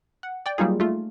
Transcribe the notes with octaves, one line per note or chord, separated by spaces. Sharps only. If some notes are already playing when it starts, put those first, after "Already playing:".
F#5
D5 G5
F#3 G3 A#3 D#4 F4 G#4
A3 F4